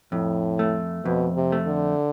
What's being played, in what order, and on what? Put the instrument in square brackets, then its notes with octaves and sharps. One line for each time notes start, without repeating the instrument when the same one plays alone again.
[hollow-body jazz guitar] F2 [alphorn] A2
[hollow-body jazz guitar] A3
[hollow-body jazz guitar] F2 [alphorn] B2
[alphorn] C3
[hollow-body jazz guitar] A3
[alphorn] D3